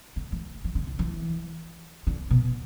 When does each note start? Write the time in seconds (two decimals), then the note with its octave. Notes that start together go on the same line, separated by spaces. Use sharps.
0.16 D3
0.32 E3
0.64 E3
0.75 D3
0.87 D3
0.99 E3
2.07 D3
2.31 B2